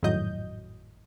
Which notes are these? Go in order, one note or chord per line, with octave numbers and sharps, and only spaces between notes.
G#1 F2 A2 F#3 D#5 G6